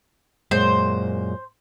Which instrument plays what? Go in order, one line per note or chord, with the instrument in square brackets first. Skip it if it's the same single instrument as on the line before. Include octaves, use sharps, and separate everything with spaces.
[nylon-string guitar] F#2 A#2 G#3 [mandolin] C5